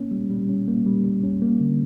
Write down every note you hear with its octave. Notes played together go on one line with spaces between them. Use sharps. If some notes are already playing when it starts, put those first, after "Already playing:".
Already playing: A#3 C#4
G3
G3
C#4
A#3
G3
G3
C#4
A#3
D3